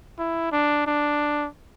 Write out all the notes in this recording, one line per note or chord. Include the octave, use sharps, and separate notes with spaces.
E4
D4
D4